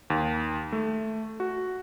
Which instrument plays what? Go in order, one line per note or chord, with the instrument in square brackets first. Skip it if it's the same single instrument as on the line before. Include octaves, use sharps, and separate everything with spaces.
[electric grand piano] D#2
A3
F#4